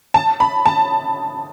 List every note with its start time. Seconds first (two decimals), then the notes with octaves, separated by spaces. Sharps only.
0.14 A5
0.40 B5
0.66 A5